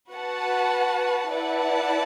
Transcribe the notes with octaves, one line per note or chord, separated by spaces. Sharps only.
F#4 B4 F#5 A5
E4 B4 D5 F#5 A5